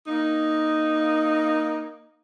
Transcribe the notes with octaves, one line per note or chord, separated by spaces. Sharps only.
A#3 D#4